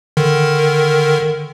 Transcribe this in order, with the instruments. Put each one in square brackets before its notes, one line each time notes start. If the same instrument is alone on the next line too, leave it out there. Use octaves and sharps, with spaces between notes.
[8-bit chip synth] D3 D#3 A#4